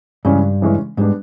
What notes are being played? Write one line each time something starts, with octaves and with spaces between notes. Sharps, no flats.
G2 C#3 E3 G#3 C#4
C#3 E3 G#3 C#4
G#2 G3 B3 D4